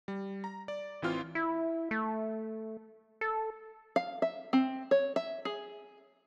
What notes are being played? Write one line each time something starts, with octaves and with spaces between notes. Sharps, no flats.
G3
A#5
D5
A1 E3 C4 F4 F6
E4
A3
A4
F5
E5
C4
C#5
E5
G#4